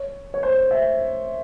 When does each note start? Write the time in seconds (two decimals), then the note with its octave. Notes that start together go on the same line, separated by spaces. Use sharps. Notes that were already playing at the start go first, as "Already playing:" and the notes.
Already playing: C#5
0.34 C#5
0.43 C5
0.71 E5